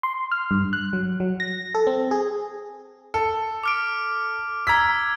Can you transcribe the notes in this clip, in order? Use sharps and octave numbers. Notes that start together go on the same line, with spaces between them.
C6
F6
G2
F#6
F#3
F#3
A#6
A4
C4
G#4
A4
D6 F6 D7
A#5 E6 G#6 B6